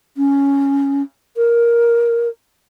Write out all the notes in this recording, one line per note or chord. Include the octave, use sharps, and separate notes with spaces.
C#4
A#4